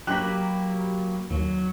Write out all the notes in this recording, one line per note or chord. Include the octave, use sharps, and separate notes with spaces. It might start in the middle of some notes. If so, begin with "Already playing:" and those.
F#3 A#3 G4 A#5 B5 F#6
D#2 F#3